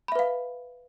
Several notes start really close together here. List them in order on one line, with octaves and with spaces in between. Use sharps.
B5 E5 B4 F5